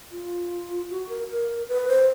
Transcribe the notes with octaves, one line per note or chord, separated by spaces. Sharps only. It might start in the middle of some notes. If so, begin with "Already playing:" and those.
F4
F#4
A#4
A#4
B4
C5